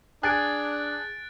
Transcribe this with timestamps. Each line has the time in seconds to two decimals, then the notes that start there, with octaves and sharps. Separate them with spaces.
0.23 D4 G#4 F#6 A6 D7